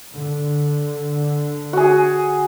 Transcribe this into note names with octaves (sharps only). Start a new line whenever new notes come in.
D3
F#4 G#4